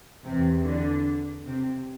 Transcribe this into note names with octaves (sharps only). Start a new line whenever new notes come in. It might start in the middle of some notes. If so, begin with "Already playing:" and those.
E2 C3 E3 C4
D3 D4
C3 C4